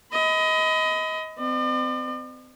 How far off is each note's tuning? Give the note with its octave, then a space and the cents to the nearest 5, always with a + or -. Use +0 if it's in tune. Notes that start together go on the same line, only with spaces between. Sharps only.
D#5 +25 B5 +35
C4 -35 D5 +45